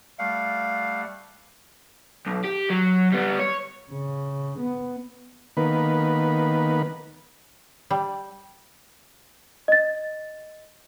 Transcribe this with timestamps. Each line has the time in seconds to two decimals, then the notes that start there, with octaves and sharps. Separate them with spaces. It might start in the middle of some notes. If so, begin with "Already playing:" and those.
0.19 G3 A3 F5 F#5
2.26 B1
2.45 G4
2.70 F#3
3.12 G3 B3
3.40 C#5
3.92 C#3
4.60 B3
5.57 D#3 A#3 B3 B4
7.90 G3
9.68 D#5 A6